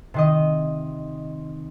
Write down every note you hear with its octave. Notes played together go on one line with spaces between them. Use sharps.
C3 D#3 D#5